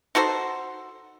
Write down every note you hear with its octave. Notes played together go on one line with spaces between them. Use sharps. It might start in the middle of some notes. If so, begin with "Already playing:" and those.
D#4 F#4 A4 C5